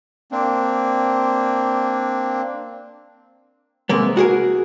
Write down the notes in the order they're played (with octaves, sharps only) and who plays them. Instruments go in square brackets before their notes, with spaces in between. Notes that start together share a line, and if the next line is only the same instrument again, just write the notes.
[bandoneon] A#3 C4 D4
[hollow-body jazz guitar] C3 G#3 A#3 B3
F#4 G#4 A#4